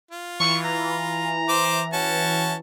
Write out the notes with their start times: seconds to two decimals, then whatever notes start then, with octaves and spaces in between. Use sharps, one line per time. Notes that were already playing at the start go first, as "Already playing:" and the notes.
0.11 F4
0.40 E3 C#6
0.65 A#5
1.49 C5 D6
1.93 C#4 F#4 A5